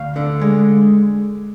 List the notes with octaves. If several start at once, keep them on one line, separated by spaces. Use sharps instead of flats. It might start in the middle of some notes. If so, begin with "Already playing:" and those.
Already playing: D2 F5
D3
G#3